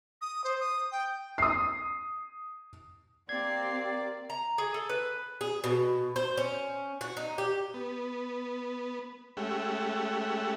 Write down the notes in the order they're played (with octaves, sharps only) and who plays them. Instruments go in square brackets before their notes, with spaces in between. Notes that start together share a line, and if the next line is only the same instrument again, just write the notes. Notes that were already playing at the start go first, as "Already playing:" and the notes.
[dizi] D#6
C5
D#6
G5
[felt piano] D#6 C7
[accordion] A#3 D5 [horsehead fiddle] C4 G4 [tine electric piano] G#6 [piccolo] C7
[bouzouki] A#5
G#4
A4
B4
G#4
B2
C5
C#4
F#4
D#4
G4
[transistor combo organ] B3
G#3 A3 C#4 G4 E5 F#5